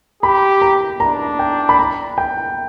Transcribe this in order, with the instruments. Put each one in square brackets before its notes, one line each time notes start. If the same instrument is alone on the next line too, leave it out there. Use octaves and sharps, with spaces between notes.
[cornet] G4 [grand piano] B5
[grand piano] A#5
[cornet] D4 [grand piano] A#5
[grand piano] G5
B5
A#5
G5